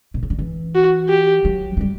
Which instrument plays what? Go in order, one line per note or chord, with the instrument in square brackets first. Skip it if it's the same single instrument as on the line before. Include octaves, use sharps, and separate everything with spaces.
[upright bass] B2
C#3
D3
E3
[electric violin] F#4
G4
[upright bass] F#3
A3
G3